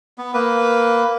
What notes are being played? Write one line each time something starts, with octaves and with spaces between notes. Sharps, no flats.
B3
A#3 B4